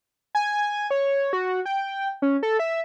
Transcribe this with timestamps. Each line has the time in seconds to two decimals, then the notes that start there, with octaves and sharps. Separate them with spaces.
0.35 G#5
0.91 C#5
1.33 F#4
1.66 G5
2.22 C#4
2.43 A4
2.59 E5